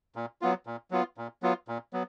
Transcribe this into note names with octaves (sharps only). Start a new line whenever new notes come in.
A#2
F#3 B3 F4
A#2
F#3 B3 F4
A#2
F#3 B3 F4
A#2
F#3 B3